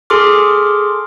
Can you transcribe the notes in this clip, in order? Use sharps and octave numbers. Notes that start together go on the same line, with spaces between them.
G#4 A4 C6 D6 F6